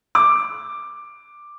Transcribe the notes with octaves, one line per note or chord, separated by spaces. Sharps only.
D6